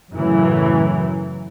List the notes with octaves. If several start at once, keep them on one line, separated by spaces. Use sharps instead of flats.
F#2 A2 C#3 E3 F#3